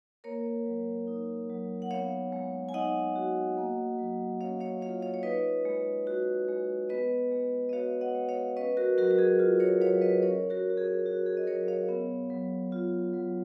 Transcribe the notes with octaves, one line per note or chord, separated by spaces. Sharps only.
A#3 A#4 C#5
F#3
D#4
F#3
F#5
B3 C#5 F5
G#3
G#5
D#4 D#5 F#5
F#4
A#3
F#3
C#4 C#5 F5
C#5 F5
F4 C#5 F5
C#5 F5
C#5
D#4 B4 D#5
G#3
F#4
G#3
B3 B4 D#5
G#3
D#5
F#4 C#5 F5
D#5 F#5
G#3
C#5 F5
C#4 B4 D#5
F#4 A#4
F#3 F#4 A#4
F#4
G#4
F4
A#4 C#5
F#3 C#5 F5
B4 D#5
C#4 A#4 C#5
F#4 A#4
F#3
F#4
G#4
F#4
G#4
D#5
F#3 A#4 C#5
C#5 F5
B3
F#3
F4
F#3